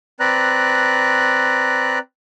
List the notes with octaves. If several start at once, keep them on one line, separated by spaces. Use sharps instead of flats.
C4 B4 D5 A#5 F#6